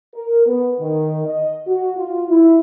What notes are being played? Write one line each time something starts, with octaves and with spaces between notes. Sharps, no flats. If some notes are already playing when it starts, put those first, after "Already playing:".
A#4
B3
D#3
D#5
F#4
F4
E4